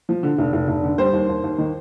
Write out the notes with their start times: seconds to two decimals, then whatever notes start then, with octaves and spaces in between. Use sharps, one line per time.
0.09 F3
0.23 D3
0.38 F1
0.53 F1
0.68 F1
0.83 D3
0.98 G3 C5
1.13 D#2
1.29 D#2
1.43 D#2
1.58 D#3